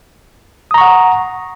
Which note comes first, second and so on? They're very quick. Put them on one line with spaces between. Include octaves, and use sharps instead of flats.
D#6 A#5 C#6 F#5